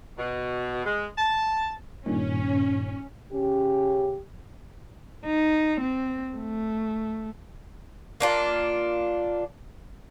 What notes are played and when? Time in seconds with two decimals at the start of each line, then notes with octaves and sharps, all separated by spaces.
0.18 B2
0.85 G#3
1.18 A5
2.06 G2 A#2 D#3 C#4
3.31 C#3 C#4 G4
5.26 D#4
5.81 C4
6.36 A3
8.20 A#3 D4 F4